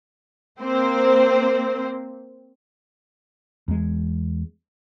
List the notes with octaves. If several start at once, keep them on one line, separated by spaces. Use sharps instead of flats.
A#3 C4 C5
E2 G#3